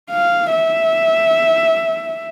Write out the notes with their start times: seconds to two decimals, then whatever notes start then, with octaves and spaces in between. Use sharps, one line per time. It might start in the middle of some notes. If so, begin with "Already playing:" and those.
0.11 F5
0.52 E5